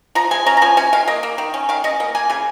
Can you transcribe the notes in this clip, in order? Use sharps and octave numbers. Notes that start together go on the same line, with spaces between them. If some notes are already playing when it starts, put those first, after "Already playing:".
F3 A#5
G#3 G#5
C#4 A#5
A#5
F3 G#5
C#4 G#5
D#3 F5
A#3 D#5
A#3
D#3
C#4
D#3 F5
C#4 D#5
A#3 D#5
A#3 G#5
C#3 G#5